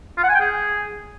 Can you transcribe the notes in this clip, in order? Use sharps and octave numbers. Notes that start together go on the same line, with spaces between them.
F4
F#5
G#5
G5
G#4